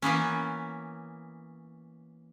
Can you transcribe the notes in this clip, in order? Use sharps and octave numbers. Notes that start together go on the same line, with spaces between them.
E3 A#3 B3 C#4